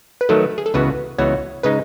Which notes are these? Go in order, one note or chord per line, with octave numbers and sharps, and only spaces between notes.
B4
D#3 F#3 A3 A4
G#4
A4
C#2 C#3 E3 B3 F#4 B4
C#2 C#3 E3 B3 F#4 C#5
C#3 G#3 D#4 B4